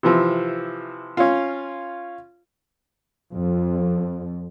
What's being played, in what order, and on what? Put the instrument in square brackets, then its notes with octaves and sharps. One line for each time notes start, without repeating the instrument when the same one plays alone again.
[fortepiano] C3 E3 F3
C#4 F4
[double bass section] F2